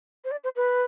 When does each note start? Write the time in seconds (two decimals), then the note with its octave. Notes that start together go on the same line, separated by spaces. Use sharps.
0.24 C5
0.31 D5
0.44 C5
0.56 B4